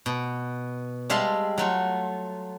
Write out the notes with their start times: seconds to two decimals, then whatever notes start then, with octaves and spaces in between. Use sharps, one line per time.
0.06 B2
1.10 G3 G#3 E5 F5 A5 C6
1.58 F#3 A3 F4